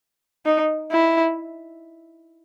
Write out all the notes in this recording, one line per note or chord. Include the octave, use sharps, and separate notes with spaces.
D#4
E4